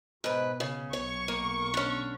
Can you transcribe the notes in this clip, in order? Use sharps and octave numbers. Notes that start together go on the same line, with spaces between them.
G#2 B2 B4
C#3
B1 C#5 C#6
A#3
D3 C#4